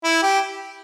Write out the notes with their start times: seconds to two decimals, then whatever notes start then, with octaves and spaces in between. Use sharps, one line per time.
0.04 E4
0.22 G4